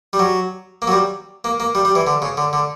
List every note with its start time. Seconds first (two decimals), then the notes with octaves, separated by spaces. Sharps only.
0.13 G3
0.19 F#3
0.82 A#3
0.87 F#3
0.92 G3
1.44 A#3
1.60 A#3
1.75 G3
1.85 G3
1.95 E3
2.07 D3
2.22 C#3
2.37 D3
2.53 D3